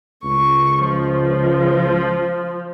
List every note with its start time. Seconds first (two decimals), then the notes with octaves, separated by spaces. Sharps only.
0.25 C#2 C#6
0.87 F3